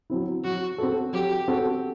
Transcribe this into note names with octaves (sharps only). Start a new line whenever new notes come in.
F#3 C4 E4
F#3 F#4
C4 F#4 A4
F#3 G4
C4 F#4 A4